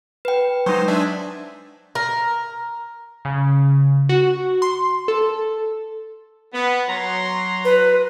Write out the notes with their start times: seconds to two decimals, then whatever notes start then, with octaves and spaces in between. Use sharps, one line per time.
0.25 B4 G5
0.66 F#3 G#3 D#4 C5
0.88 D4 E5 G#5
1.95 A#4
3.25 C#3
4.09 F#4
4.62 C6
5.08 A4
6.54 B3
6.88 F#3 A#5 C6
7.65 B4